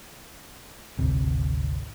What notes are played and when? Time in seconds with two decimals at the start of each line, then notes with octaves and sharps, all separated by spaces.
0.99 G#1 D2 C3